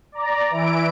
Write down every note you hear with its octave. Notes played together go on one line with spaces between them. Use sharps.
D5 A#5
E3 E4 D7